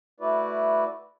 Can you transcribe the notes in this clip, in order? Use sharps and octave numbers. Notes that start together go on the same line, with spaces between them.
A3 E4 F#4 B4 D5